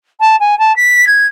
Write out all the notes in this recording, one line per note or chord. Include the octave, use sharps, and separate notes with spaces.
A5
G#5
A5
B6
G#6